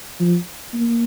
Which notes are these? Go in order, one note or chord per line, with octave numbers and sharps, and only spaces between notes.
F3
A#3